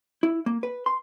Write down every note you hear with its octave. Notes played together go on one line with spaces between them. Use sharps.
E4
A#3
B4
C6